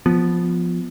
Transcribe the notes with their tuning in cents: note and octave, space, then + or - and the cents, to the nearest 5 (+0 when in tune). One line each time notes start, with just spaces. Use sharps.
F3 +0 B3 +0